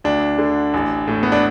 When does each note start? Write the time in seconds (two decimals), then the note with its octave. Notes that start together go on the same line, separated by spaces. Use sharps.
0.04 D2 D4
0.38 D3
0.74 A1
1.08 A2
1.23 B3
1.32 D4